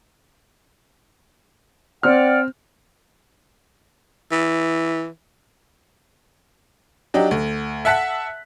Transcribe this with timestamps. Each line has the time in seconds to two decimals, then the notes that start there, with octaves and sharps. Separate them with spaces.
2.03 C4 D5 F#5 G5 F6
4.32 E3
7.14 F#3 D4 D#4 G4
7.31 D2
7.85 E5 F#5 A5 F#6 B6